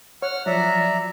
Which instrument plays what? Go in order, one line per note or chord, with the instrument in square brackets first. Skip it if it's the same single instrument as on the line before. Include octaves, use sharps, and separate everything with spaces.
[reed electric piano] C#5 [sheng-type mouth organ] F#5 F6
[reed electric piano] F3 F#3 [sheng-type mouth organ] D5 E5 A#5